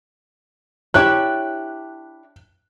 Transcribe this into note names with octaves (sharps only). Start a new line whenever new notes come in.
D4 E4 G4 C#5 E5 F#6